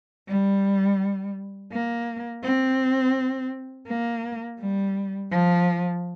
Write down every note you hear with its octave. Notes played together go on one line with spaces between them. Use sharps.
G3
A#3
C4
A#3
G3
F3